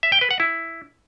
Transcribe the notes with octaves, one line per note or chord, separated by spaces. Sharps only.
E5
G5
B4
F#5
E4